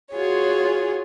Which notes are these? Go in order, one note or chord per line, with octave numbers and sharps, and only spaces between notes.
F4 F#4 G#4 C#5